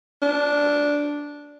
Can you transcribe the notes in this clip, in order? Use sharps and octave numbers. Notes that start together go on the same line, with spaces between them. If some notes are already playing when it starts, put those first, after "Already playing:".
D4